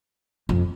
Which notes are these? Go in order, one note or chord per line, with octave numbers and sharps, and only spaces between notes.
F2